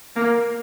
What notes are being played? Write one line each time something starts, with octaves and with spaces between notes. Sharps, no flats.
A#3